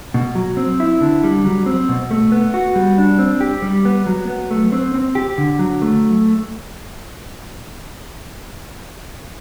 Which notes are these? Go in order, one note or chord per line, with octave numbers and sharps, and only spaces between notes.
B2
F#3
C4
E4
D3
G3
F#3
C4
B2
A3
B3
F#4
G3
D4
C4
G4
G3
B3
F#3
B3
A3
C4
C4
G4
D3
F#3
A3